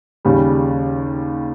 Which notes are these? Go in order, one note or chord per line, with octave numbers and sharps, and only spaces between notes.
D#2 C#3 G3